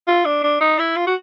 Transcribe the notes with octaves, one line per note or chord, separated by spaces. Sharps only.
F4
D4
D4
D#4
E4
F4
F#4